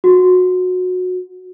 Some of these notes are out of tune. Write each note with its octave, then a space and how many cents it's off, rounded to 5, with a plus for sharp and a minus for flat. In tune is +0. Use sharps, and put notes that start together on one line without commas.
F#4 -20